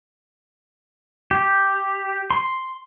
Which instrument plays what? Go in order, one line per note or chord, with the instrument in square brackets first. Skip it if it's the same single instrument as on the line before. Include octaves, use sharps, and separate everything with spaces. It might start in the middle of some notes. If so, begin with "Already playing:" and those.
[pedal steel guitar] G4
C6